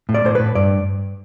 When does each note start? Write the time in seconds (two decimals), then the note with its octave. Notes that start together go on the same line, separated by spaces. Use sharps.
0.09 A2
0.14 D5
0.25 A2 C5
0.35 A2 B4
0.55 G2 D5